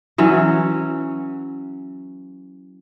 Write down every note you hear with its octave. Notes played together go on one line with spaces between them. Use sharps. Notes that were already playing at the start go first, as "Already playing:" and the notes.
E3 F#3 C#4